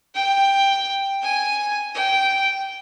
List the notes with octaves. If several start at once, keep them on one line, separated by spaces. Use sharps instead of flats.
G5
G#5
G5